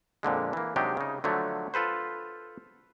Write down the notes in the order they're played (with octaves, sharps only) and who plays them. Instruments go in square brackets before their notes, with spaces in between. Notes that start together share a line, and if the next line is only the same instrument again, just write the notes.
[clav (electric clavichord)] F2 A#2 D3 G#3
E3 A#3
C3 F#3 G#3 D4 D#4 G4
C#3 D#4
D3 F3 F#3 A3
F4 A4 B4 C5